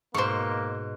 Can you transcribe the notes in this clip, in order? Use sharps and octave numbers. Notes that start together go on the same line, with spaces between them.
G#2 B2 A#3 C5 C#6